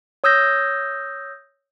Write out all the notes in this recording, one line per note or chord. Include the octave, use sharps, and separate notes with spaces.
C#5 D#6 E6 G6 A#6